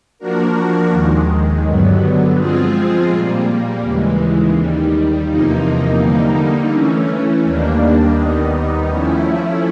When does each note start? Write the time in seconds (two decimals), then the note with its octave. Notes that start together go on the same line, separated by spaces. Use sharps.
0.18 F3 A#3 D4 F#4 A#4
0.91 D#2 D#3 G#3
1.63 G2 D3 F#3 B3
2.36 F3 G#3 C4 F4 G#4
3.08 A#2 G3 A#3
3.80 D#2 C#3 E3 G#3
4.53 D#2 D#3 G3
5.26 E2 C3 F3 A#3 D#4
5.99 D3 G3 A#3 D#4
6.71 E3 A3 C#4
7.43 D#2 D#3 G3 A#3 D4
8.15 D#2 D#3 G3 B3 D#4
8.88 F3 A3 C#4 E4